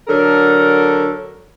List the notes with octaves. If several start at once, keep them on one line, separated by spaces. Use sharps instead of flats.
D3 F#3 A4 A#4